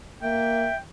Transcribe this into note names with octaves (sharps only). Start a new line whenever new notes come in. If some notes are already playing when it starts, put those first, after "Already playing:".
A#3 E5 G5